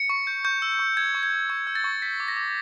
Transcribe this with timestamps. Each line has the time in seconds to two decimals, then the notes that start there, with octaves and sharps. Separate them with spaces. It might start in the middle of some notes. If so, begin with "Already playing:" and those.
Already playing: C#7
0.10 C#6
0.27 G6
0.45 C#6 G6
0.62 E6
0.79 C#6
0.97 E6 G#6
1.15 C#6
1.23 G#6
1.32 G6
1.50 C#6 G#6
1.67 E6
1.75 A6
1.84 C#6
2.02 G6 B6
2.20 D6
2.28 A#6
2.37 D6